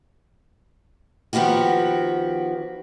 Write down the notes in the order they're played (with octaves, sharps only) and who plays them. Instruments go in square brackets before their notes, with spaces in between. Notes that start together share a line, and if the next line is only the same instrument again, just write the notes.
[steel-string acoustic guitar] D#3 F3 B3 F#4 G4